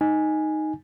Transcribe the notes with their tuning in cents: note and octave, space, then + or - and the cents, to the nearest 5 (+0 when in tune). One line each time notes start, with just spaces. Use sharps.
D#4 +0 G#5 +0